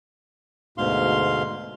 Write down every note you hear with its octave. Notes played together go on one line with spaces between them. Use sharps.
D2 G#2 B2 F5 C6